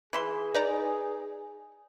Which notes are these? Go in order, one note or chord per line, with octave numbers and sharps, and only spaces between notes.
E3 G#4 E5 C6
D#4 B4 D5 A#5